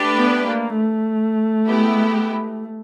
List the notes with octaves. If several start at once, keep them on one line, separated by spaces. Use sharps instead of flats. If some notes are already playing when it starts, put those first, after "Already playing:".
Already playing: A3 D4 G4 B4
B3
A#3
A3
G#3 B3 E4 G4